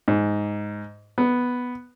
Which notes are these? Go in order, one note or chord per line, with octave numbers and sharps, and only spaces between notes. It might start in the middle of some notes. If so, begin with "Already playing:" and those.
G#2
B3